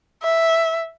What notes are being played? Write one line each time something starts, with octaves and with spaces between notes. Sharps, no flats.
E5